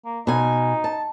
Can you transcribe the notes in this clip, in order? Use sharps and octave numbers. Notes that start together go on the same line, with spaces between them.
A#3
B2 D#4 G#5
A5